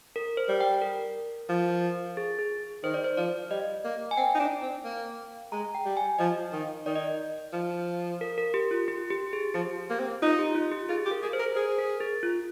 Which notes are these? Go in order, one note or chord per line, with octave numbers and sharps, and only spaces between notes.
A#4
C5
G3
G5
A#4
F3
G#4
G#4
D#3 C5
D5
C5
F3 D5
G3 D#5
A#3
G#5
C4 G5
D#4
D4
C4
A#3
G#3 A#5
G5
G3
G#5
F3 D#5
D#3
D#3 D5
D#5
D5
F3
A#4
A#4
G4
F4
G4
G4
G#4
F3 G4
A#3
C4
D#4 F4
G4
F4
G4
F4 G#4
G4
A#4
G#4 A#4
C5
A#4
G#4 C5
A#4
G#4
F4